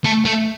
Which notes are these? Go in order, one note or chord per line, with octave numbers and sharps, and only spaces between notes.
A3
A3